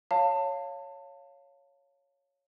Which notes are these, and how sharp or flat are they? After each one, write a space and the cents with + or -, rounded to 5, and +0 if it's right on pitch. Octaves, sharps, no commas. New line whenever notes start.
C#5 +0 F5 +0 A5 +25